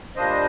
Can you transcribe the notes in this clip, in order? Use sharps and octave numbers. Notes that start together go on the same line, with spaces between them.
A#2 G3 A#3 D4 C5 D#5